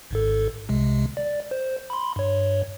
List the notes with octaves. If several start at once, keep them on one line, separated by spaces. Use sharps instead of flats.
G#1 G#2 A4
C2 C3 G#3
D5
C5
B5 C6
G2 C#5